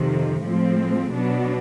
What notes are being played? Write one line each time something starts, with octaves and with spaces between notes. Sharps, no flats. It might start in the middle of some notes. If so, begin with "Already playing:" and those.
Already playing: F2 C3 D#3
A2 F3 G#3 C4
B2 F#3 B3 D4